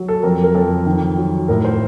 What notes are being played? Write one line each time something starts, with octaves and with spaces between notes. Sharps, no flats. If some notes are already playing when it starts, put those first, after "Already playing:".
Already playing: F#3
A4
F2 A#4
A#4
F2 A4
D#3
F#3
A2 A#4
C5